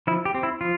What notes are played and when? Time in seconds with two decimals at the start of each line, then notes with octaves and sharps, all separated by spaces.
0.07 F3 E4
0.25 G4
0.35 C4
0.43 E4
0.61 F3 F4